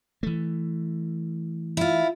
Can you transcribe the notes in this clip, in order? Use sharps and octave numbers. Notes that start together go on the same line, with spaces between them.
E3 A3
E4 F4